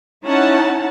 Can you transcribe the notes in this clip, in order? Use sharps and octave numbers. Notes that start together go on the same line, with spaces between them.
C#4 D#4 E4 F#5 A5